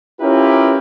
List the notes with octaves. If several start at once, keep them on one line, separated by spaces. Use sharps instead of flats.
C#4 E4 F4 G4 A#4 B4